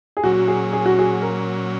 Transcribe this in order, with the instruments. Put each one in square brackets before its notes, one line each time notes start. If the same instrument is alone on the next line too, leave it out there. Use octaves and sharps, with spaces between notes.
[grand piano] G#4
[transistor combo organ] A#2 F#3 C#4 [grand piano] F#4
[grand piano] G#4
G#4
F#4
G#4
A#4